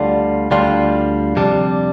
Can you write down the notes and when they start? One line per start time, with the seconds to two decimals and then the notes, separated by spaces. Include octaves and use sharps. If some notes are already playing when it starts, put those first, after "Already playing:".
Already playing: D2 D3 G3 D4 F4
0.51 D2 D3 G3 D4 F4
1.36 F2 C3 G3 D4